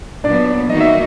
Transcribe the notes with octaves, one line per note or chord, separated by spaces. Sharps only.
A#2 F#3 B3 D4 D5
D#3 G3 A#3 D#4 F#4 D#5
E5